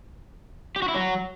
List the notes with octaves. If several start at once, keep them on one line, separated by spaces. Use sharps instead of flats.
G4
F#4
E4
F#3